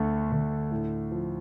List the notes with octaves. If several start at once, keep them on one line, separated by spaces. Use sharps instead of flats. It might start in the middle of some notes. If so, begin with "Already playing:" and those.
Already playing: D2 D3 A3
D2
A2
F3